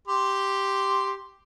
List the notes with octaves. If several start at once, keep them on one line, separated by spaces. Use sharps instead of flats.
G4 C6